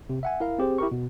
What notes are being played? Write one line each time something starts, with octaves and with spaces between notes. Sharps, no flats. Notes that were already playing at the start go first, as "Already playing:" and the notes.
C3
E5 F#5 G#5
E4 A#4 F5
C4 G4 G#4 C5
E4 G4 A#4 C#6
B2